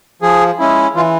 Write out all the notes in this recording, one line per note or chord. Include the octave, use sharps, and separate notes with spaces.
F3 G#4
G#3 C#4 E4
E3 F4